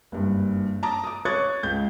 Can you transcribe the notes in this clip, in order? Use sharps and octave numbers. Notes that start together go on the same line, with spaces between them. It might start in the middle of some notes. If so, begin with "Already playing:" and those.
F#1 G2
A5 A#5 D6 D#6
D6 D#6
C#5 C#6 D#6 F#6 G#6 A6
C#2 G6